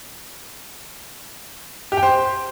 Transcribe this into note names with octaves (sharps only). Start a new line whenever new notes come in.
G4
G5
C5